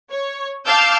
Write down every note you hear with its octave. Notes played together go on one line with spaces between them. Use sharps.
C#5
F5 A5 D6 E6 F6 G6